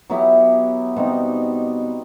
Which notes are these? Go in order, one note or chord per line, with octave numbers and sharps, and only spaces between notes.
F#3 B3 E4 G4
B2 G3 C4 D#4